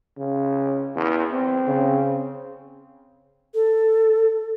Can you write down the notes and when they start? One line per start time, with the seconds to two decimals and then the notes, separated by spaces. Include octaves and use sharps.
0.18 C#3
0.96 E2
1.32 C4
1.68 C#3
3.54 A4